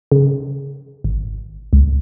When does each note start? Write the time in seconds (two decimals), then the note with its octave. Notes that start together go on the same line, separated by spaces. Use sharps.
0.12 C#3
1.04 G#1
1.73 C#2